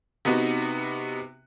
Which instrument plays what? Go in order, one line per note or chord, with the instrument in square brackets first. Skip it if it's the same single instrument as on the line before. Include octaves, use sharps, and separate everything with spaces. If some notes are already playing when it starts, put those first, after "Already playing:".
[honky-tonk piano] C3 B3 D#4 F#4